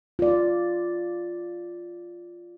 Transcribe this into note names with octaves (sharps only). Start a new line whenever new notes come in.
F4 D5